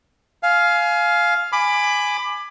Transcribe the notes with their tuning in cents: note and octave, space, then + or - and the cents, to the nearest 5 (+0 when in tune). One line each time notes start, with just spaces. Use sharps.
F5 +0 G#5 +25
G#5 +0 B5 +15 D6 +20